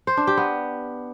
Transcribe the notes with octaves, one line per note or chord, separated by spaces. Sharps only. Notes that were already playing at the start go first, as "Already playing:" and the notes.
C5
D4
G4
B3